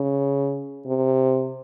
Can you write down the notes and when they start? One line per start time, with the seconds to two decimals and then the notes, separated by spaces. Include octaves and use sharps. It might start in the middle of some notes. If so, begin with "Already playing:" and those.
Already playing: C#3
0.87 C3